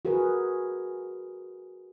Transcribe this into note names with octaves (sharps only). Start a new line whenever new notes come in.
F#4 G#4 A#4 B4